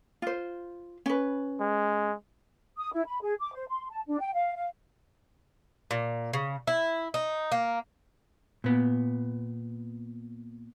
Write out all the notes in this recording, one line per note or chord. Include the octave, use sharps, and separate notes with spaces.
F4 C5
C#4 B4
G#3
D#6
E4
B5
G#4
D6
C5
C6
A5
D4
G5
F5
F5
A#2
C#3
E4
D#4
A#3
A#2 B3